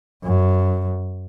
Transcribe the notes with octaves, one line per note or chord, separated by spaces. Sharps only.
F#2